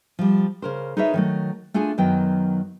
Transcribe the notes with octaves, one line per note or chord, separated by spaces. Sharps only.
F3 G3
C#3 A#4 C5
D#4 G#4 A#4 B4 C#5 E5
D#3 F#3 A3
A3 D4 F4 G#4 G#5
F#2 D#3 F#3 B3 G5